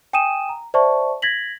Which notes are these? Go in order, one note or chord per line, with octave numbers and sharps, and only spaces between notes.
G5 G#5 D#6 D#7 E7
A#5
C5 D5 E5 A5 C#6
G#6 A#6 B6 F#7